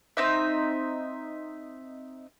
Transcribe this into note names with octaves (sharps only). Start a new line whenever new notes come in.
C4 D#4 E5